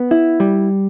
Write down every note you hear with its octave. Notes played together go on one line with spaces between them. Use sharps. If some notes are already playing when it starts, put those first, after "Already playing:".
Already playing: B3
E4
G3